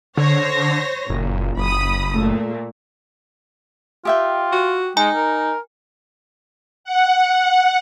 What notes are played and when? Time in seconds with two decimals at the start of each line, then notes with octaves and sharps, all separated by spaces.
0.17 D3 C5 C#5 A#6
1.10 F#1 A#2
1.57 F#1 B5 D#6
2.13 A#2 A3
4.05 F4 G4 E5 G5
4.52 F#4
4.97 G#3 D#4 G#5
5.15 A#4
6.84 F#5